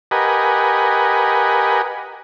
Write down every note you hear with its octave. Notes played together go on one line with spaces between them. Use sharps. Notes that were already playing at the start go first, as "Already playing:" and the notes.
G4 A#4 B4 D#5 F#5 G#5